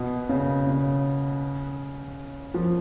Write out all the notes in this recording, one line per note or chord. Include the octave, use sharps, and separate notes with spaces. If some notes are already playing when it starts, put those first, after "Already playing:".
Already playing: B2
C#3
C#3
F3